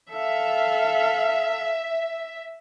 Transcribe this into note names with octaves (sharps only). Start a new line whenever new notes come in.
A4 E5 F5